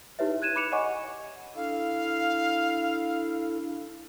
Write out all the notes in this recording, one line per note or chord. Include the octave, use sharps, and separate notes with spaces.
D#4 E4 G4 B4 C#5 E5
F#6 G#6 D#7 E7
B5 D6 F#6 C#7 E7 F7
C#5 D#5 F#5 G#5 C#6 D6
D4 E4 A4 F5